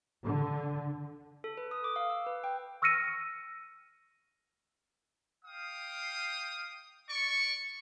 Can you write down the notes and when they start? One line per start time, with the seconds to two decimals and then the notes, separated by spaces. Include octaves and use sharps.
0.25 D3
1.44 A4
1.57 B4
1.71 D#6
1.84 D6
1.96 F5
2.10 E6
2.27 B4
2.44 G5
2.82 C#6 E6 F6 A#6 C#7 D#7
5.45 F5 G5 D#6
7.09 D5 C#6